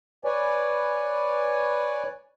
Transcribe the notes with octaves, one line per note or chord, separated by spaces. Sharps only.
B4 C#5 D5 G#5